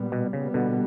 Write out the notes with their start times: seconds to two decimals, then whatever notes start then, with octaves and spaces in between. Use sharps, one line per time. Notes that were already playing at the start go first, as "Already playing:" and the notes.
Already playing: A#2 G3 B3
0.12 B2
0.33 A#2 C#3 G3 B3
0.54 B2 D3